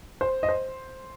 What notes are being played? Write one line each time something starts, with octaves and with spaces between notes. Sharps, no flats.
C5
D#5
C5